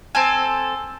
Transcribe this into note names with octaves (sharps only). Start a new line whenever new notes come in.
C4 A4 G#5